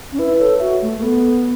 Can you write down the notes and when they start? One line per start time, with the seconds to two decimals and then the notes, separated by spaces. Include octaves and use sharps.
0.12 C#4
0.19 E4 B4
0.35 B4
0.39 A4 C#5
0.60 F#4 E5
0.82 A3
0.98 A3
1.02 B3 A4